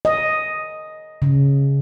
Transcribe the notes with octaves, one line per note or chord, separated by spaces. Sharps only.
D#5
C#3